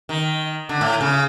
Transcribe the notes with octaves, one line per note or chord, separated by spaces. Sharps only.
D#3
D3
A2
C#3